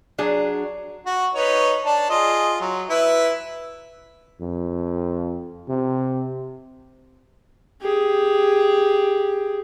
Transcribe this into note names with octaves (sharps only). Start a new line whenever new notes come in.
F#3 D4 G#4
F#4
D#4 B4 C#5
D4 A5
F4 G#4 D#5
F#3
E4 B4
F2
C3
G4 G#4